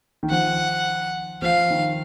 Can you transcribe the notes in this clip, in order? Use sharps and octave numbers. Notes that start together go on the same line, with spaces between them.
D#3
F3 F#5
F3 F5
D#3